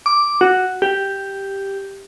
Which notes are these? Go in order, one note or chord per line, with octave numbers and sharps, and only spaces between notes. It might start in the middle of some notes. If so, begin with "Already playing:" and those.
D6
F#4
G4